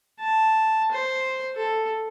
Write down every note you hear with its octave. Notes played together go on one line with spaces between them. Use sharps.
A5
C5
A4